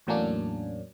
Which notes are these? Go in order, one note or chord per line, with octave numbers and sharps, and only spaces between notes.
E2 A2 F#3 A#3 C#4 D4